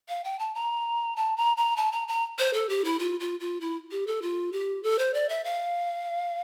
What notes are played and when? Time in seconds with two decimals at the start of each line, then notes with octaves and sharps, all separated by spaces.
0.09 F5
0.24 G5
0.39 A5
0.55 A#5
1.16 A5
1.37 A#5
1.57 A#5
1.77 A5
1.92 A#5
2.08 A#5
2.39 C5
2.53 A4
2.69 G4
2.84 E4
2.99 F4
3.20 F4
3.40 F4
3.61 E4
3.91 G4
4.07 A4
4.22 F4
4.52 G4
4.83 A4
4.99 C5
5.14 D5
5.29 E5
5.44 F5